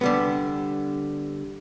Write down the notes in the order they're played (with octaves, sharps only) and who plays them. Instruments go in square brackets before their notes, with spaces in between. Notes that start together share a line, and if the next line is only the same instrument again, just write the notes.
[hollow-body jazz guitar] D3 G3 B3